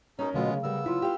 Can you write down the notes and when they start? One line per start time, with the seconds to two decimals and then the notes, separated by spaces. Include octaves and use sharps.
0.19 B2 C#4 D#4 A#4
0.34 B2 D3 F#3 G#3 A3 B3 F4
0.52 C#3
0.63 G3 B3 A#4 E6
0.86 C#3 F#3 E4 F4
1.02 G4 F5